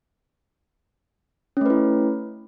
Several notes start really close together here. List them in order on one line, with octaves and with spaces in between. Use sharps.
C#4 A3 B4 E4